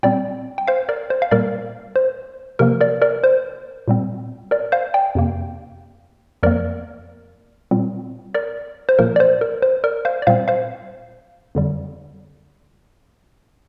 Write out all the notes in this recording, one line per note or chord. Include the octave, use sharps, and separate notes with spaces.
A#2 G3 C4 D5 G5
G5
C5 F5
A#4 D5
C5
F5
A#2 G3 A#3 A#4 D5
C5
C3 F3 A#3 A#4
A#4 D5
A#4 D5
C5
A#2 G3 C4
A#4 D5
C5 F5
D5 G5
F2 C3 A#3
F2 F3 A#3 A#4 D5
A#2 G3 C4
A#4 D5
C5
A#2 F3 A#3 A#4
D5
C5
A#4
C5
A#4 D5
C5 F5
D5
A#2 G3 C4 C5 F5
C5 F5
F2 D3 G3